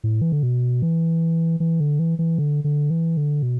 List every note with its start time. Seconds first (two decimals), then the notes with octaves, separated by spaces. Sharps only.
0.04 A2
0.22 E3
0.32 D3
0.43 B2
0.82 E3
1.60 E3
1.80 D3
1.99 E3
2.19 E3
2.38 D3
2.64 D3
2.90 E3
3.17 D3
3.43 B2